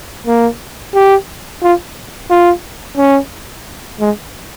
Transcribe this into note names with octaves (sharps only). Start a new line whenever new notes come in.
A#3
G4
F4
F4
C#4
G#3